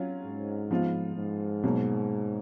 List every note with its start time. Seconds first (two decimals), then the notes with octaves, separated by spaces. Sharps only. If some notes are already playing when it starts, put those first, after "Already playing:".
Already playing: F#3 C#4 F4
0.24 G#2
0.71 F3 B3 F4
1.16 G#2
1.64 B2 F#3 A#3